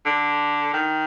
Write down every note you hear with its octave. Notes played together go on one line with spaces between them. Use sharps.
D3
D#3